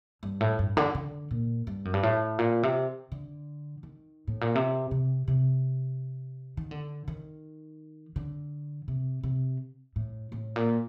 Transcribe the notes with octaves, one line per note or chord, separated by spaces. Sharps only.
G2
A2
G2
D3
D3
A#2
G2
F#2
G2
A2
A#2
C3
D3
D#3
A2
A#2
C3
C3
C3
D#3
D3
D#3
D3
C3
C3
A2
A2
A#2